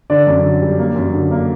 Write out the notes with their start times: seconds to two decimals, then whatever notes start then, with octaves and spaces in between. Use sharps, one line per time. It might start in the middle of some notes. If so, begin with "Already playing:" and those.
0.10 D3 D5
0.27 F#2
0.43 D3
0.61 G3
0.79 A#3
0.96 F#2
1.13 D3
1.31 A#3